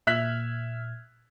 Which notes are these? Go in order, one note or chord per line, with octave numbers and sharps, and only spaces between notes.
A#2 E5 F6 F#6 G#6 B6